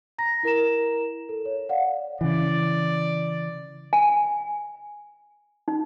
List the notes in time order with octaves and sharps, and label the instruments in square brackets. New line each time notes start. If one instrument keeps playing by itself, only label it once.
[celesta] A#5 A#6
E4 A#4 A#5 E7
A4
C#5
D5 F5 F#5
[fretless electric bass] C#3 E3 [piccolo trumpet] D5
[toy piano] G#5
D#4